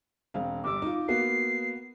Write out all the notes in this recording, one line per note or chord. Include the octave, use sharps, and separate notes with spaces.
E1 C4 F5
G1 G3 D6 E6
D#4 F4
A#3 B3 F#4 C7